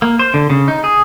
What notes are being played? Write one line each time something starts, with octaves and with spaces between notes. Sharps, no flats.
A#3
C5
D3
C#3
D#4
G#4